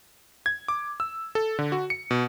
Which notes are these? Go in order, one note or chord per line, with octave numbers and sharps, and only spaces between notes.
G#6
D6
E6
A4
D3
F#4
C#7
B2